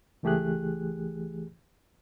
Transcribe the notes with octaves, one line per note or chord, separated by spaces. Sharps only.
C#2 E3 A3 G4 G#4 F#6